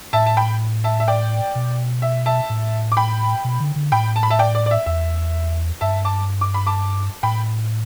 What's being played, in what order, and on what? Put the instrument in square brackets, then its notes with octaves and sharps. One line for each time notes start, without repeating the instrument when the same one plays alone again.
[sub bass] A2 [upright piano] E5 A5
[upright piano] A5
G5 B5
E5 A5
E5
D5 G5
[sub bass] B2
[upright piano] E5
E5 A5
[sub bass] A2
[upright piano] D6
G5 B5
[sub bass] B2
D3
D3
[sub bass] A2 [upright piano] G5 B5
[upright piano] A5
B5
E5 A5
D5 G5
D5
D5
E5
[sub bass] E2 [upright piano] E5
[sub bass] G2 [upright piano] E5 A5
[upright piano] A5 D6
D6
B5
A5 D6
[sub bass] A2 [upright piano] G5 B5